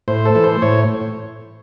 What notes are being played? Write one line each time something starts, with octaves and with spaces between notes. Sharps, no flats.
A2 C5
A4
E3 A3
C5
A2 C#5